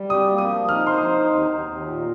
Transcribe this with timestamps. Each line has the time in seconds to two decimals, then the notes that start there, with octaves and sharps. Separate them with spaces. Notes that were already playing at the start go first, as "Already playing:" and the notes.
Already playing: G3
0.09 G4 D#6
0.29 A#3
0.38 D#6
0.48 F3
0.69 D#4 F6
0.87 C5 C6
0.98 D#6
1.08 D#4
1.27 D#2
1.47 D#2
1.66 D#2
1.85 A#2